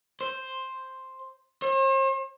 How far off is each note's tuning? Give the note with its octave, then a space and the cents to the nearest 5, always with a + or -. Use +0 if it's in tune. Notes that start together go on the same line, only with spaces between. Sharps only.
C5 +5
C5 +45